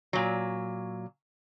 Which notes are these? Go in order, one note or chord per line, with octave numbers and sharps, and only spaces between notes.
A#2 F#3